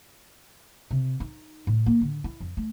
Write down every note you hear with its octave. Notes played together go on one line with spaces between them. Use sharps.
C3
D#4
A2
A#3
D3
E4
F2
A3